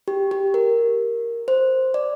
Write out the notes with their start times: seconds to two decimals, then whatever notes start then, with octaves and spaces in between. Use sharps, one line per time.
0.08 G4
0.31 G4
0.54 A#4
1.48 C5
1.94 D5